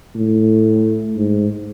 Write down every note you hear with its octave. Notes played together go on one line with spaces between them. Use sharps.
A2
G#2